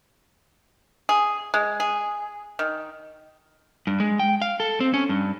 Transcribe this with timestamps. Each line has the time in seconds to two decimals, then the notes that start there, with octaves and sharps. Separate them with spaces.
1.09 G#4
1.54 G#3
1.80 G#4
2.59 D#3
3.87 G2
4.00 G#3
4.20 G5
4.42 F5
4.60 A4
4.80 C4
4.94 C#4
5.09 G2